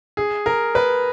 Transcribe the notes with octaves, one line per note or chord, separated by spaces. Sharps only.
G#4
A#4
B4